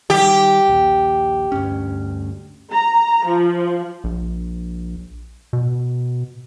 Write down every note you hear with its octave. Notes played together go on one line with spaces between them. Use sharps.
D#3 G3 G4
A#1 D#2
D2 G2 C#4
A#5
F3
A#1
B2